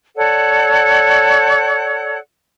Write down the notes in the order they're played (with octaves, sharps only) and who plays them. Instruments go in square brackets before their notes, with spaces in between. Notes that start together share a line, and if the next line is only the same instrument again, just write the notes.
[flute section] A4 C#5 D5 F#5